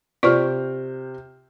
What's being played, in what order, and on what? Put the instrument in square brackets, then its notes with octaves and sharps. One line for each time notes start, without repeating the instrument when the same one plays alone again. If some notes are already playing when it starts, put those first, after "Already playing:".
[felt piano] C3 C5 F6 [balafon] F4 D5 C#6